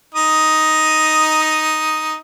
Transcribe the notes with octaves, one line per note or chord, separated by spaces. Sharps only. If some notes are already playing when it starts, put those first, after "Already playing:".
D#4 D#6